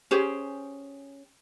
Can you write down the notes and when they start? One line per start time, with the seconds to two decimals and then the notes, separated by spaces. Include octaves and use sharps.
0.11 C#4 G4 G#4 C5